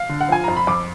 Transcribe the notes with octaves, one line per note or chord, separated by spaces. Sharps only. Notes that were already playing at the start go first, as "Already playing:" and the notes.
Already playing: F5
D3
F#5
F3 G#5
F2 A#5
B5
F2 D6